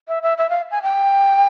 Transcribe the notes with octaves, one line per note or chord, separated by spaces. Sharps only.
E5
E5
E5
F5
G#5
G5